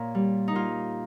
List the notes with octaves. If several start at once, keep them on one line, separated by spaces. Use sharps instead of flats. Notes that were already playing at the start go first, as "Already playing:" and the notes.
Already playing: A#2 A#4 C#5
G3
D#4
A#2 F4